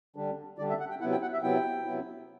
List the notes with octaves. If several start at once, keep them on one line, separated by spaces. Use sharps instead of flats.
D3 G3 D4
D3 G3 D4 D5
E5
F#5
G5
C3 F#3 B3 E4 F#5
G5
F#5
E5
C3 F#3 B3 E4 G5
C3 F#3 B3 E4